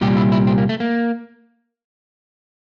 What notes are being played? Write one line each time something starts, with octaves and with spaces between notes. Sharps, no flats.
C2 A#2 G3 G4
E4
E4
C4
A#3
A3
A#3